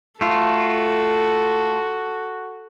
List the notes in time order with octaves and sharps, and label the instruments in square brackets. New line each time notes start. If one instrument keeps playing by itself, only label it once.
[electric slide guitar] A3 F4 [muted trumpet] F#4 [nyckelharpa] A4